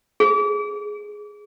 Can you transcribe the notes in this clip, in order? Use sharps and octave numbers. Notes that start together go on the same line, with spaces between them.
G#4